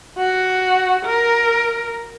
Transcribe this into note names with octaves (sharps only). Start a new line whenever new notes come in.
F#4
A#4